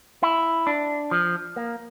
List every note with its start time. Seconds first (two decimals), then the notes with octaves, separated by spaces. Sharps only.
0.23 E4
0.67 D4
1.11 F3
1.56 A#3